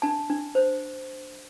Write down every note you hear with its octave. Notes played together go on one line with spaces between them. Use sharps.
D4 A5
D4
C5